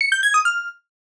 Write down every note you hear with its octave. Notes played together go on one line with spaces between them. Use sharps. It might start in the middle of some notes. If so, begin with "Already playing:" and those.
C#7
G6
G#6
D#6
F6